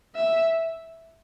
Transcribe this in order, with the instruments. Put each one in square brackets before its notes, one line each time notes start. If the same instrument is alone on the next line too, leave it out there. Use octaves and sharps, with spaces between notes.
[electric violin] E5